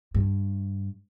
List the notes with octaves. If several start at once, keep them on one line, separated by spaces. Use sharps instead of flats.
G2